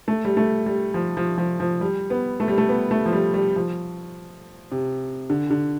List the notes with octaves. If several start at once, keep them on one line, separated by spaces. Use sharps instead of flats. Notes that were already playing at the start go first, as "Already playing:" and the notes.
A3
G3
A3
G3
F3
F3
F3
F3
G3
B3
A3
G3
A3
B3
A3
F3
G3
G3
F3
C3
D3
D3